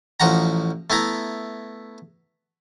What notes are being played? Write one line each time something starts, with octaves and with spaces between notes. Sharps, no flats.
A1 F3 F#4 F#5 A#5
A3 B3 E4 A#5